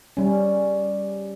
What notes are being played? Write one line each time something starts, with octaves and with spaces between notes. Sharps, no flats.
G3 C#4